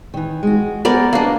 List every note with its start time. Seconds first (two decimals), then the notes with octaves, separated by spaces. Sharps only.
0.14 D#3 E3
0.43 G#3 F#4
0.85 B3 G#4 A#4 C5 D5
1.13 A#3 D4 F#4 B4 D#5